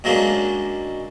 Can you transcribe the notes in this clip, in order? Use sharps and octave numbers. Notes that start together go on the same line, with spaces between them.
A#2 F#3 G#3 A#3 C#4 D4